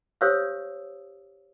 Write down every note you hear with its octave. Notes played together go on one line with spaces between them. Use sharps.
G4 C5 C#5 F5 D#6 E6